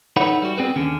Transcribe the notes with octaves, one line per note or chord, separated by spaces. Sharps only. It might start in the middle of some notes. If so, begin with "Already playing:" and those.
D#4 E4 A4 B4 C#5 F#5
G3 F#4
B3 C4 G#4 B4
D#2 D3 C#4